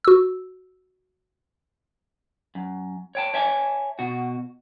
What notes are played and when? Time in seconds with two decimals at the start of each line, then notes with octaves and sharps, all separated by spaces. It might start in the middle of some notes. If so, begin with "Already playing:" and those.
0.05 F#4 E6
2.55 F#2
3.15 C#5 G5 A5
3.34 C#5 E5 G#5 A5
3.99 B2 F#4